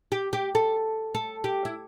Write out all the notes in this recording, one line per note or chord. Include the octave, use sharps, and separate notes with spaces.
G4
G4
A4
A4
G4
E4